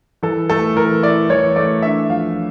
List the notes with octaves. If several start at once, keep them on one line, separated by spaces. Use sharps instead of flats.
E3 A4
A3 A4
E3 A#4
E4 D5
E3 C#5
A3 D5
D4 E5
F3 F5